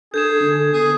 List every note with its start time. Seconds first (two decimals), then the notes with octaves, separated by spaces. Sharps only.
0.14 D4 G#4 A4 G6 G#6 E7
0.43 D3
0.73 B3 G#4